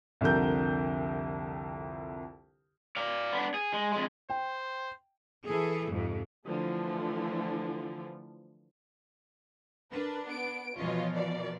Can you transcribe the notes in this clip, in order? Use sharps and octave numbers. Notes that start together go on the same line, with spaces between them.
C2 F2 D3 A#4 G6
D5 F5
B3 D4
G#4
G#3
F2 G#3
C5 G5
E3 G#4 A4
F2 G#2 C3
D3 E3 F3 A3
D4 A#4 B4
B3 D7
B2 E3 F3 F4 C#5 D#5
A#4 D5